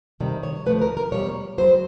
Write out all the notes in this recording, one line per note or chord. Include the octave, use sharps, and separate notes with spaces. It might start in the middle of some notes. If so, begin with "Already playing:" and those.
F2 C3 D#3 G3
C#5
D2 D3 F3 A3 B4
A#4
A#4
E2 B2 G3 C#5
F2 C#3 F#3 C5